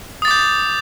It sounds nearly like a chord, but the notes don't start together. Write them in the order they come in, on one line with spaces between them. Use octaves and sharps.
D#6 A6 D6 G6